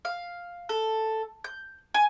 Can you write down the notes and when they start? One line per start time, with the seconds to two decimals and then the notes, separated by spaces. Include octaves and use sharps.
0.05 F5
0.69 A4
1.44 G6
1.94 G#5